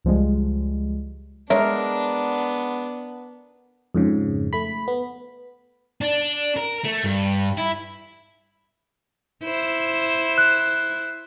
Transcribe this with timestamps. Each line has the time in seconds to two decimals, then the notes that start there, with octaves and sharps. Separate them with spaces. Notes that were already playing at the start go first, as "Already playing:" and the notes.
0.05 C#2 F3 G3 G#3
1.50 G#3 B3 D4 A#4 C#5 E5
3.95 F2 G#2 C#3
4.53 A3 B5
4.88 B3
6.01 D4
6.57 A#4
6.84 A3
7.04 G2
7.58 E4
9.44 E4 C5
10.38 F#6